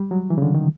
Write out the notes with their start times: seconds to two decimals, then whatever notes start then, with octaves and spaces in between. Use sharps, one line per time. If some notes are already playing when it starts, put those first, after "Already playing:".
Already playing: G3
0.11 F#3
0.30 E3
0.38 C#3
0.42 D3
0.54 D#3